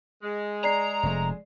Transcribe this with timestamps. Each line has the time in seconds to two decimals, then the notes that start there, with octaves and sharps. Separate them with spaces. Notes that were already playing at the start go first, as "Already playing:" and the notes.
0.23 G#3
0.64 D5 A#5 C7
1.03 F1 A3